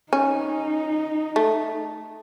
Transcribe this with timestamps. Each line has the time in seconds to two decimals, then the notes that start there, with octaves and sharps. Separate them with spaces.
0.13 C#4 D#4
1.36 A3